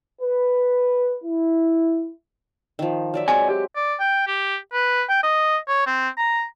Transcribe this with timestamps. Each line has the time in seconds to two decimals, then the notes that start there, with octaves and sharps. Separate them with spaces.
0.22 B4
1.24 E4
2.79 D#3 F3
3.14 F#3 D5 E5
3.28 F#3 G#3 C4 D5 G#5
3.49 G4
3.76 D5
4.00 G5
4.28 G4
4.73 B4
5.09 G5
5.23 D#5
5.68 C#5
5.87 C4
6.18 A#5